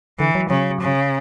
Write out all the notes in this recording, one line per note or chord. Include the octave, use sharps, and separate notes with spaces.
D3 E3
F#3
C#3 F#3
C#3